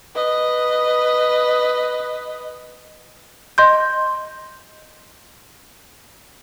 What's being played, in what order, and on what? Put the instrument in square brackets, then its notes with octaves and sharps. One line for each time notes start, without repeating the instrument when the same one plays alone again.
[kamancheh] B4 D#5
[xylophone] D#5 C6 G6